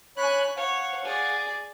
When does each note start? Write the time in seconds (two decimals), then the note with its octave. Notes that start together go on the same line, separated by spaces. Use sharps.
0.17 C#5 G#5 B5 F#6
0.57 C#5 F5 F#5
1.04 G#4 D5